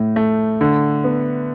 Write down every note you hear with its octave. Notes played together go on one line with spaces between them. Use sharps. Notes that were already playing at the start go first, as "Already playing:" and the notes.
Already playing: A2
A3
D3
B3